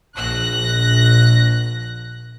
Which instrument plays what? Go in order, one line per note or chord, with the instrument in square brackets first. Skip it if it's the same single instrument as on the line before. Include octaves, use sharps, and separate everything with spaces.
[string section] A#1 F#6 A#6